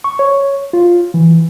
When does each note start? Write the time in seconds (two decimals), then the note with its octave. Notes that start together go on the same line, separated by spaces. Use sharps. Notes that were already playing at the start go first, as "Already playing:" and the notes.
0.04 C#6
0.19 C#5
0.73 F4
1.14 E3